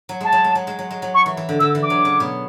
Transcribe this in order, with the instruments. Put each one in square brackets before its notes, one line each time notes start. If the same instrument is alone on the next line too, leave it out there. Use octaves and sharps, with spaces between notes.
[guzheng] F#3
[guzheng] G#3 [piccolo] A5
[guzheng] F#3
G#3
F#3
G#3
F#3
G#3
F#3
[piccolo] C#6
[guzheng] E3
E3
D3
[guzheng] D3 [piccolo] E6
[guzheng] E3
[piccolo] D6
[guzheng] F#3
C#3
B2